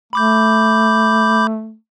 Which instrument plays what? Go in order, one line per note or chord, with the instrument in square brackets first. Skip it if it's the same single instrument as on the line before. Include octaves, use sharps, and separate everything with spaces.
[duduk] A3 [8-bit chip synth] B5 D6 G6